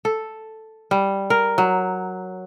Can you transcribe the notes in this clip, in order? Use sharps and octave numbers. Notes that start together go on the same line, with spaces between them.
A4
G3
A#4
F#3